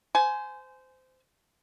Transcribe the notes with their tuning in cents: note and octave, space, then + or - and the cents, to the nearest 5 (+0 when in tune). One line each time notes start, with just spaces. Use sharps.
C5 -20 G#5 +15